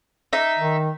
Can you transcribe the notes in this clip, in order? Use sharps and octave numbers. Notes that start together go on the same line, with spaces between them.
D#4 E5
D#3